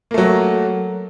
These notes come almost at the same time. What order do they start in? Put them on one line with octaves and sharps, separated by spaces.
A#3 A3 F#3